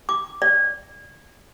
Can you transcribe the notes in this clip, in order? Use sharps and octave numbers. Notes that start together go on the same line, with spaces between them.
D6
D5